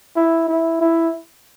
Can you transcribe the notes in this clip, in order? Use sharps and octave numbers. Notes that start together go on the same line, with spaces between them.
E4
E4
E4